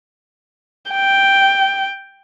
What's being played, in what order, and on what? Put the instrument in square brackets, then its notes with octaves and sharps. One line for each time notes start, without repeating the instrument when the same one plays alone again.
[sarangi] G5